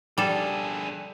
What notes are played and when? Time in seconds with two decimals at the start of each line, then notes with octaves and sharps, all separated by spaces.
0.18 G3 D4 G#4 A4